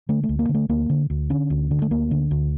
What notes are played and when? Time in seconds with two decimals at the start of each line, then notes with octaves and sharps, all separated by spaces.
0.09 D3 A3
0.23 A3
0.29 D2
0.39 A#3
0.49 D3
0.54 A3
0.69 D2 A#3
0.90 D3
1.10 D2
1.30 D3 C#4
1.50 D2
1.71 D3
1.82 A3
1.91 D2 A#3
2.11 D3
2.31 D2